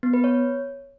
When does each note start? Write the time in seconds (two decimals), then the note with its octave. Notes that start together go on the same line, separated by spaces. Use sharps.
0.03 B3
0.13 B4
0.24 C#5